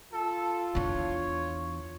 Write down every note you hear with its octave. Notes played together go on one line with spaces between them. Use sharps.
F4 A4
E2 D4 C#5